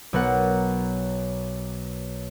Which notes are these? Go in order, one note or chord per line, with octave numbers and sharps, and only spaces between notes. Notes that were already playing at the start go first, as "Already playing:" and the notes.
B1 B3 A#4 F#5